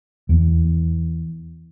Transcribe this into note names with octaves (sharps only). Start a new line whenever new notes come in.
E2 E3